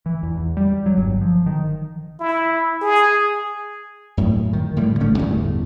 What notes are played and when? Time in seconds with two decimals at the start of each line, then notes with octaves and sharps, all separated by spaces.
0.06 E3
0.23 E2
0.37 E2
0.57 G3
0.86 F#3
0.97 G1
1.21 F3
1.46 D#3
2.20 E4
2.82 G#4
4.17 F#2 A2
4.53 D#3
4.77 A2 D3 G3
5.00 A1 A3 C#4
5.17 G1 E2 A2